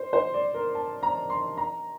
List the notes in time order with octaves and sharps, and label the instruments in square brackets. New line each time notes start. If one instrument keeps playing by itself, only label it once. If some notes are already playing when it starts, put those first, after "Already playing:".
Already playing: [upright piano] C5
C5
D5
A#4
A5
A#5
C6
A#5